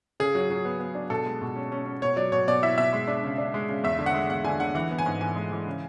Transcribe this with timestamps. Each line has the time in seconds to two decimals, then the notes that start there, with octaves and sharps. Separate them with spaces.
0.20 C#3 G#4
0.35 F#3
0.50 F#3
0.65 B3
0.80 B3
0.95 D4
1.10 B2 A4
1.26 G#3
1.42 B2
1.56 C#4
1.72 C#4
1.86 C#4
2.02 B2 C#5
2.16 F#3 D5
2.32 B2 C#5
2.47 B2 D5
2.62 E4 E5
2.78 B2 E5
2.93 G#3
3.08 D4
3.24 C#3
3.38 D4
3.54 G#3
3.69 C#3
3.84 E2 E5
3.99 D3
4.06 F#5
4.14 G#3
4.29 E2 F#5
4.44 D3 G#5
4.60 D3 F#5
4.75 E3 F#5
4.91 B3
4.98 G#5
5.06 G#2
5.21 E3 G#5
5.36 G#3
5.52 E3
5.67 C#3